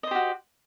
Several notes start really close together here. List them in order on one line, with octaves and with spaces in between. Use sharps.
D#5 C5 G4 F#4